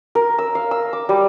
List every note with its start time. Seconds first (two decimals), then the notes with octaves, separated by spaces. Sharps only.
0.15 A#4
0.38 E6
0.55 F5
0.71 E6
0.93 D6
1.09 G3